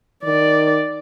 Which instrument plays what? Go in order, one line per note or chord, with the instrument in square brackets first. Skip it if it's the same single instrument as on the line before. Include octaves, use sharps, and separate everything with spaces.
[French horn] D#3 [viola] D5